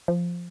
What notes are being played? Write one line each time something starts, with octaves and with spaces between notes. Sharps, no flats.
F3